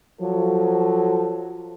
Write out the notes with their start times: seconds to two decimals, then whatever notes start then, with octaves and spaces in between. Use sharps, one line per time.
0.21 F3 F#3 A4